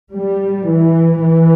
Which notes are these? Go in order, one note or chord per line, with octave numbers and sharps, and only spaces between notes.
G3
E3
E3